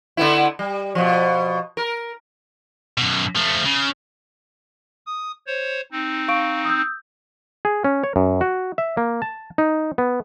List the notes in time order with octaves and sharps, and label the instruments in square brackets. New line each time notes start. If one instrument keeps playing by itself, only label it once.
[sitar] D3 B3 E4
G3
B2 F3
A#4
[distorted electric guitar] F#2 B2
F3 A3
C#3
[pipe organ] D#6
C5 C#5
C4 D#4
[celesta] F5 C#6 D7
D#6 E6 G6
[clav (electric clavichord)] G#4
C#4
C#5
F#2
F#4
E5
A#3
A5
D#4
B3